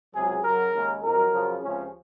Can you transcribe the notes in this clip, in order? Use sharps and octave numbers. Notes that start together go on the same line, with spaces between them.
C#2 C3 F#3 G#4
F#2 C#3 F#3 A#4
D#2 C#3 G#3
F2 D#3 F#3 A#4
F#2 C#3 F3
C#2 C3 F3 C#4